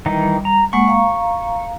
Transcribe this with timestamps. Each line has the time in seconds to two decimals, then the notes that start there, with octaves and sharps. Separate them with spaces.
0.06 D#3 E3 G3 D#4
0.45 A#5
0.73 G#3 A#3 F#5 C#6
0.88 F5 A#5